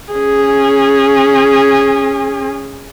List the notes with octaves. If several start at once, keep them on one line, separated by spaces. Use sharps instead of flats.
C#4 G#4